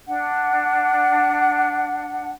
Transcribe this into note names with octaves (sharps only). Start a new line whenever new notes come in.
D4 F#5